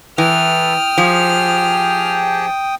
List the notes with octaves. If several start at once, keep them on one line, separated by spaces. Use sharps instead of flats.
E3 A4 B4 G5 D#6 F6
F3 G4 G#4 A5